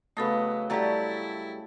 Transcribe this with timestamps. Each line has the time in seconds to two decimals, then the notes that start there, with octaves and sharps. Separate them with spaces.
0.17 C#3 F#3 A3 B3 A4 D#5 B5
0.70 G3 A3 E4 F#4 A5 A#5